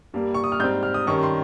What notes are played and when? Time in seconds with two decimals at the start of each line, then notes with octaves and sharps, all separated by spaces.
0.14 G2 G3 A#3
0.34 C#6
0.44 D#6
0.52 F6
0.60 G#2 G3 C4 G6
0.83 F6
0.94 D#6
1.07 G2 D#3 G3 C#4 C#6
1.23 C6